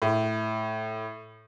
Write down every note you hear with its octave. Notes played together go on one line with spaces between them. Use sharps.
A2